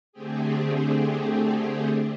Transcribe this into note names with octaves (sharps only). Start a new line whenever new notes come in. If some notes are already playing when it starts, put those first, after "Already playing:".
D3 A3 C4 G4 G#4